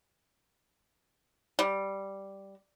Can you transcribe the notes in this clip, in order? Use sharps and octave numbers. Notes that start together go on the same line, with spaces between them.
G3